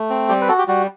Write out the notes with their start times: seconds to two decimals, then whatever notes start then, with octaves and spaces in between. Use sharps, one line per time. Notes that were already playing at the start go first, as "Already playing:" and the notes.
Already playing: A3
0.10 C4
0.29 G3 G4
0.41 B4
0.48 F#4 A4
0.58 G4
0.68 G3 F#4